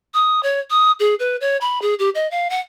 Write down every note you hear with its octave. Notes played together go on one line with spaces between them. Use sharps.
D#6
C#5
D#6
G#4
B4
C#5
B5
G#4
G4
D#5
F5
F#5